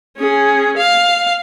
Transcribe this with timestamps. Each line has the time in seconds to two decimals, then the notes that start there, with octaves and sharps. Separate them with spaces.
0.17 C#4 G#4
0.77 F5